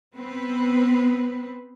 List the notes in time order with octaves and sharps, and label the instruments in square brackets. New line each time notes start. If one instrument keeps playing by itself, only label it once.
[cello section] B3 C4 B4